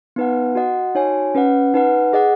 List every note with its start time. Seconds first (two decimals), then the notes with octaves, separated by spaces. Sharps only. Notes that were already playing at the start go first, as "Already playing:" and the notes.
0.16 B3 D#4 B4 F#5
0.55 F#4 D#5 F#5
0.95 D#4 F#4 C#5 G#5
1.35 C#4 B4 F#5
1.74 D#4 B4 F#5
2.13 G#4 D#5 F#5